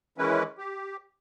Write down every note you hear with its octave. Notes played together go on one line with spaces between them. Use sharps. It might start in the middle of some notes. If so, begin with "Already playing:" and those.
D#3 E3 G#3 C#4 E4 B4
G4